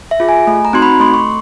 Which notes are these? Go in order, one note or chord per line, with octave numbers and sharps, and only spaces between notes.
E5
F4 G#4
G#5
A3
A#5
C4 D#4 F#4 C6
B5
A3 C6
C#6